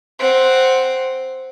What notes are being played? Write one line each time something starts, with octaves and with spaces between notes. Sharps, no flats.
C4 F#5